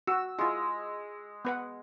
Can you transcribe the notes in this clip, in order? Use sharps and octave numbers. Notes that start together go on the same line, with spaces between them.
F#4 E6
G#3 E4 F4
B3 B4 F#5